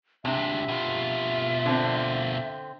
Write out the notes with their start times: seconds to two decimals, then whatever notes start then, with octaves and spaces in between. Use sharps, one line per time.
0.25 C#2 C3 D4 E5
0.68 B2 F4
1.66 D3 C4